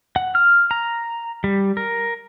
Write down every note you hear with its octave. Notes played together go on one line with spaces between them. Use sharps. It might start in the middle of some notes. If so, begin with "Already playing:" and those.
F#5
F6
A#5
G3
A#4